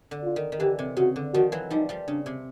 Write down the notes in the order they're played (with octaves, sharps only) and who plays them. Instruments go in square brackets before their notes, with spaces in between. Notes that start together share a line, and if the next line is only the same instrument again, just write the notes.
[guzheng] D3
[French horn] F4
[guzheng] D#3
D#3
[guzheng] D3 E3 [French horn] G4
[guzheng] C3
[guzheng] C#3 [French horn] F#4
[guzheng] D3
[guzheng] D#3 F3 [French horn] F#4
[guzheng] E3 F#3
[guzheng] F3 G3 [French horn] D#4
[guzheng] F3 G3
[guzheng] C#3 [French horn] D4
[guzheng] C3